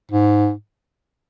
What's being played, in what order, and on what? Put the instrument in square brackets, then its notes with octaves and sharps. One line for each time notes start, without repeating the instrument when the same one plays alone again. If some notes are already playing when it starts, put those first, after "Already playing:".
[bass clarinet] G#2